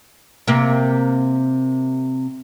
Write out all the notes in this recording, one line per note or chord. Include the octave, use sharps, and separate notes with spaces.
C3 A#3